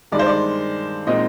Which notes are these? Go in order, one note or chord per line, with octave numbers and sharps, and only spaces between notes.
G2 D#3 G#3 D#4 D5
C5
D5
A#2 G#3 C4 D#4 D#5